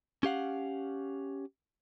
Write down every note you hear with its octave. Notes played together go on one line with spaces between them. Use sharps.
C#4 G4 F5 F#5